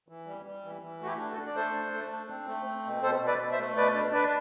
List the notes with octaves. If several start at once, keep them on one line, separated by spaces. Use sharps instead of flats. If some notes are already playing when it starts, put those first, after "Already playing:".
E3
G3
G3
E3
E3
A3 F#4
E4 G4
D4
F#4 A4
D4
D5
A3 A4 C5
D4
A3
D4
C4
A3
C4
B2
B2 A4 C5
B2
B4 D5
B2
C5 E5
A3
B2 B4 D5
D4
D4 B4 D5